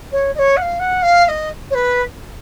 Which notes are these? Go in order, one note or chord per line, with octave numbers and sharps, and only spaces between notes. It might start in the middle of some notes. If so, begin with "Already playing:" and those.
C#5
D#5
C#5
F#5
F5
F#5
F5
F5
D#5
C#5
B4